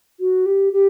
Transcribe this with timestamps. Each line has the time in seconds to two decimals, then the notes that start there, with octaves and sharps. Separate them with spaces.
0.20 F#4
0.46 G4
0.73 G4